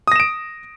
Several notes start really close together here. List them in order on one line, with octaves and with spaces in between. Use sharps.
D#6 A#6 E7 D7